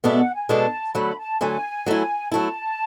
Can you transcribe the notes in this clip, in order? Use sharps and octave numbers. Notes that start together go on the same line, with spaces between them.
B2 G#3 B3 D4 A4 E5
F#5
G#5
B2 G#3 B3 D4 A4 A5
D3 F#3 A3 B5
A5
D3 F#3 A3 G#5
F#3 A3 E4
F#3 A3 E4 A5